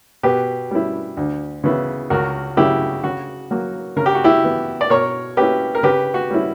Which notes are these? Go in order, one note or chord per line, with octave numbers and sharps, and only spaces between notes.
B2 G4 B4
G3 C#4 E4
D2
C#3 E3 B3 E4
C#2 F#4 A#4
C#3 F#3 E4 G4
C#3 F#4
F#3 A#3
C#3 A#4
G4
F#4
E4 G4
E3 B3
D5
B2 A#4 C#5
A#3 C#4 E4 G4 B4
A#4
C#3 G4 B4
F#4
G3 C#4 E4